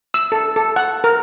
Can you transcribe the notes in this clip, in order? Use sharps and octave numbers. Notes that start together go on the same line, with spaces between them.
E6
A4
A4
F#5
A#4